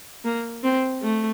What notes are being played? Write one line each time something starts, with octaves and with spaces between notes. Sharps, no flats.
A#3
C4
A3